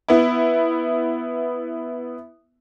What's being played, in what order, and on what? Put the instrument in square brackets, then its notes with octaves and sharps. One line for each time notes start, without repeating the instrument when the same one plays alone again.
[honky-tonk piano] B3 E4